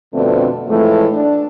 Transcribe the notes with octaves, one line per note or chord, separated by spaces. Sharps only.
F2 B2 D3 A3 C4 D4
A2 E3 F3 G#3 A3
D4